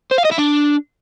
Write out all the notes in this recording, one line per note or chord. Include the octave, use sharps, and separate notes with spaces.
C5
F5
D#5
E4
D4